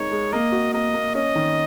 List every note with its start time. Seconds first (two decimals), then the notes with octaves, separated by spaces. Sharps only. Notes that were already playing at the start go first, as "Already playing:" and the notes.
Already playing: G#3 D#4 A#4 C#5
0.11 G#3
0.33 A#3 D#5
0.52 F#4
0.74 A#3 D#5
0.94 A#3
1.15 C#4 D#5
1.35 D#3